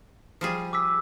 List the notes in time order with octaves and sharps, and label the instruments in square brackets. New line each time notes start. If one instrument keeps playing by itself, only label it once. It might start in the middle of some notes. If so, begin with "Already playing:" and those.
[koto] F3 G3 G#4
[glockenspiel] D6 E6 B6